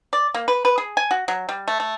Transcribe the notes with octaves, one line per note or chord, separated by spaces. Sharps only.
D5
A#3
B4
B4
G#4
G#5
F#4
F#3
G3
A3
A3